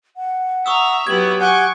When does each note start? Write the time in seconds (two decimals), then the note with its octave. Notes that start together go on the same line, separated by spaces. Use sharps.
0.17 F#5
0.66 E5 A#5 C#6 D#6 E6
1.07 F#3 B3 E4 G4 G#6
1.41 F#5 G#5 C#6 D6 G6